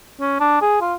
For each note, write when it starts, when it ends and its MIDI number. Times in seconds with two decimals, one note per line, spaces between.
0.20 0.39 61
0.40 0.61 62
0.61 0.81 68
0.81 0.94 65